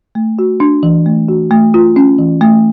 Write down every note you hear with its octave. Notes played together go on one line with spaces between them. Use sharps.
A3
F#4
D4
E3
A3
F#4
A3
F4
C#4
E3
A3